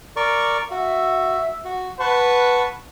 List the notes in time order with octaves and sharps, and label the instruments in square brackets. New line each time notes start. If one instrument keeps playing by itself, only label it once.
[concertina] A#4 D5 C#6
[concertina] F#4 [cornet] E5
[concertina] F#4
[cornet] B4 [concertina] F#5 A5 C#6